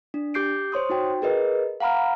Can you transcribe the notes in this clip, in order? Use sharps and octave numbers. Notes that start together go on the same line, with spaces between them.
D4
G4 D6 G6 C7 D7
C5 C#5 C6 D#6
D#4 F#4 G5
G#4 A#4 B4 D#5
F5 F#5 A#5 B5 F6